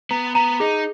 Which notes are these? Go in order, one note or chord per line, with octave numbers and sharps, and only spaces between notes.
B3 A#5
B3 A#5
D#4 G#4